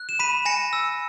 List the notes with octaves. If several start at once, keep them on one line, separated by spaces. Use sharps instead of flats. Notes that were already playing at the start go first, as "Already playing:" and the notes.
Already playing: F#6
E7
B5 B6 D#7
G#5 A#6 C#7
E6